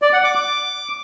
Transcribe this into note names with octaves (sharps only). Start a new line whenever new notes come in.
D5
F#5
D6
D6